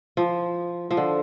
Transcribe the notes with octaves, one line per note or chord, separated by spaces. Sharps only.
F3
F3
D3